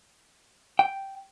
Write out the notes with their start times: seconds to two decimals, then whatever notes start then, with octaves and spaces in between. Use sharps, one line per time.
0.79 G5